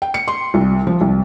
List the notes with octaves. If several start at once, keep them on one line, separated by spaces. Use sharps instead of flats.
G5
C#7
C6
C2
F3
C2